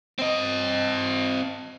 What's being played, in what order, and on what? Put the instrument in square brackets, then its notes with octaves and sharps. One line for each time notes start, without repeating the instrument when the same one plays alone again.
[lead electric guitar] C4 D#5